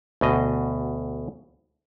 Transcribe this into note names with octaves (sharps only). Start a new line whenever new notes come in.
D2 B2 D#5